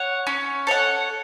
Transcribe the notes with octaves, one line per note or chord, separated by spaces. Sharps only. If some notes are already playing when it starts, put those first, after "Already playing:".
Already playing: C#5 F#5
C#4
A4 C#5 F#5